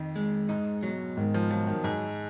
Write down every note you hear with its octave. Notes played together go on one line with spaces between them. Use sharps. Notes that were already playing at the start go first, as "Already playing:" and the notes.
Already playing: F2 D#3
G#3
G#2 D#4
B2 F#3
G#2 D#3
F3
F3 F#3
D#3
G#2 G#4